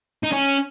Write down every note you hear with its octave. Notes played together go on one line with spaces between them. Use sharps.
D#4
C#4